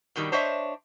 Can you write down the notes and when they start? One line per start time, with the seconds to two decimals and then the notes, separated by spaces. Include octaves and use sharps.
0.16 G2 B2 D#3 G3
0.32 D4 C5 C#5 D#5 E5